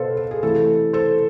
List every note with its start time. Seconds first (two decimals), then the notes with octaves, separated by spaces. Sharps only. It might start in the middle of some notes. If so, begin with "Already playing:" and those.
Already playing: B2 B3 A4 B4 C5 F5
0.17 A4
0.31 G#4
0.42 C3 E3 A3 A4
0.93 A4 C5